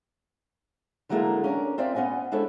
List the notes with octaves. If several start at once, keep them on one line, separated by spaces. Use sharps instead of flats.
D3 F#3 G#3 A#3 E4 A4
C#4 D4 A#4 D5
C4 F4 C5 D5 E5
B3 C#4 D#5 F#5 G#5
G#3 D4 E4 A4 C5 C#5